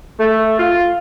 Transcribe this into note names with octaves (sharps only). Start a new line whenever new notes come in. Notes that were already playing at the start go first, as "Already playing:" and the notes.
A3
F4